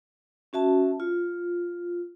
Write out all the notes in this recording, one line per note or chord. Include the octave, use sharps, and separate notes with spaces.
C#4 F#4 E5 A5
F4